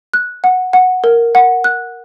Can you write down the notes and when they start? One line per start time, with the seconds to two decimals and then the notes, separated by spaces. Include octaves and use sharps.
0.13 F#6
0.44 F#5
0.73 F#5
1.04 A#4
1.35 F#5
1.64 F#6